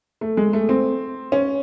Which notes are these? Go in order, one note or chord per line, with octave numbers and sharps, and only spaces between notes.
A3
G#3
A3
C4
C#4